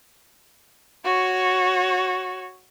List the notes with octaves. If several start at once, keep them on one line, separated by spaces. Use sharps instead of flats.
F#4 C#5